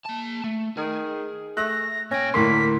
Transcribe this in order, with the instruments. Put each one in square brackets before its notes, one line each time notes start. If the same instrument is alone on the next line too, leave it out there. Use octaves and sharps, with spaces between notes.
[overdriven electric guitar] A#3 A5
A3
[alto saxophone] D#3 [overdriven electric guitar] G#4
[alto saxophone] A3 [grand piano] F#6 [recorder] A#6
[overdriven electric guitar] A#2 G5 [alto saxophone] C#4 [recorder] A#6
[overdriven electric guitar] D2 D5 [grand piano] A2 A#4 C6 [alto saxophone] A#3 [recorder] B6